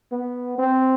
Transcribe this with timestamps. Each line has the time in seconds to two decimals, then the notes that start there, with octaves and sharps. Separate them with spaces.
0.12 B3
0.58 C4